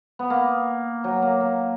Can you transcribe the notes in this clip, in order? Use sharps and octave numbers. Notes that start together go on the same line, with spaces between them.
B3
A#3
F#3
A#3
A#3